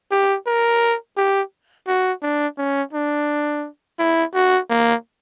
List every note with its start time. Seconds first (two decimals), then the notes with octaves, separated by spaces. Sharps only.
0.12 G4
0.47 A#4
1.17 G4
1.88 F#4
2.23 D4
2.58 C#4
2.93 D4
3.99 E4
4.35 F#4
4.70 A#3